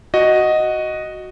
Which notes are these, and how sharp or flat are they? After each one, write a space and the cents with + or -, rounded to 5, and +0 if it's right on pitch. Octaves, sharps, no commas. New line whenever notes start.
F#4 +0 D#5 +0